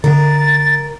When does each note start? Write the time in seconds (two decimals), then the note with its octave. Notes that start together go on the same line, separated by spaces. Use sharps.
0.04 D3 A#4 A6